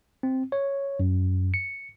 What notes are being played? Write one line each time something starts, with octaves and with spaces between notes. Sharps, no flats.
C4
C#5
F#2
C#7